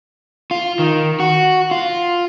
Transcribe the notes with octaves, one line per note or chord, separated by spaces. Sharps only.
F4
D#3
F#4
F4